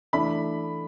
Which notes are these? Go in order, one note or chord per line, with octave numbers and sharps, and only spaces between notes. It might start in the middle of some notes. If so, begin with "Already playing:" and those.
E3 A3 D4 B5